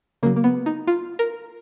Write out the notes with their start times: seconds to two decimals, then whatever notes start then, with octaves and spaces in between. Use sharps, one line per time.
0.23 C#3 F#3 A#3
0.36 A#3
0.44 B3
0.66 D#4
0.87 F4
1.19 A#4